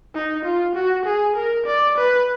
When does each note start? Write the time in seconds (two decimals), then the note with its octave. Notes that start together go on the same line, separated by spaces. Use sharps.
0.15 D#4
0.45 F4
0.75 F#4
1.05 G#4
1.36 A#4
1.66 D5
1.97 B4